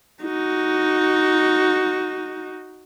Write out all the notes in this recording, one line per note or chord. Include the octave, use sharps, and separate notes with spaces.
D#4 F#4